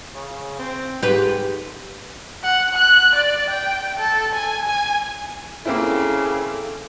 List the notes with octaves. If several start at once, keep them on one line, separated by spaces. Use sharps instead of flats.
C#3
C4
G#2 G4 B4
F#5
F#6
D5
G5
A4
G#5
G#5
C#3 A#3 C4 E4 A4